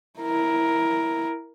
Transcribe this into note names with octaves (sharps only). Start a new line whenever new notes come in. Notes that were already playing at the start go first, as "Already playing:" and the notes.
E4 A#4